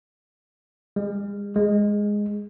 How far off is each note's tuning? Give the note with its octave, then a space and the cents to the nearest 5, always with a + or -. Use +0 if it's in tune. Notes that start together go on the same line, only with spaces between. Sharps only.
G#3 -40
G#3 -5